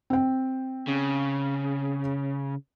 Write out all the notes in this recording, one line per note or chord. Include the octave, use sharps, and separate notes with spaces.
C4 G5
C#3